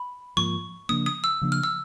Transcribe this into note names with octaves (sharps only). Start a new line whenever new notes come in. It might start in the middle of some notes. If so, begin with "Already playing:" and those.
Already playing: B5
G#2 F3 A#3 C#6
C#3 F3 A#3 D4 D#6
D#6
E6
C#3 F3 A#3 D4
F6
E6